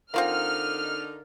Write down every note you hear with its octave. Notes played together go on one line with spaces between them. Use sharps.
D3 C4 D#4 F4 A#4 F5 F#5 F6